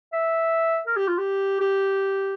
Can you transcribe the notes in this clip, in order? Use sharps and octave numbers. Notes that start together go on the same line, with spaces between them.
E5
A#4
G4
F4
G4
G4